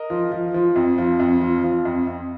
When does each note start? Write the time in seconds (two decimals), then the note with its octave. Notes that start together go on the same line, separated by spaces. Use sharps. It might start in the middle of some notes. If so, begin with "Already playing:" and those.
Already playing: A#4 D#5
0.10 F3
0.32 F3
0.54 F3
0.76 F2
0.98 F3
1.19 F2
1.41 F3
1.64 F3
1.85 F2
2.07 F2